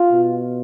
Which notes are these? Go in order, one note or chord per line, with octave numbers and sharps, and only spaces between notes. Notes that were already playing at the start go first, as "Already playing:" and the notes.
Already playing: F4
B2